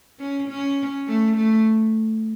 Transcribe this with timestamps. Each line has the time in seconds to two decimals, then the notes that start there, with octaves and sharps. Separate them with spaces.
0.19 C#4
0.48 C#4
1.07 A3
1.36 A3